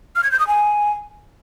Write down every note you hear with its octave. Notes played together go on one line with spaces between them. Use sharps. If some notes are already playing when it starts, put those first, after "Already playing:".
F6
G#6
G6
D#6
G#5